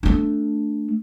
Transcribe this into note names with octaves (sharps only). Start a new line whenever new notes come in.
A3 D4